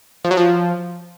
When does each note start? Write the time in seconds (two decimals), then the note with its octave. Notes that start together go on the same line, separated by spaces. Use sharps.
0.24 F3
0.31 F#3
0.37 F3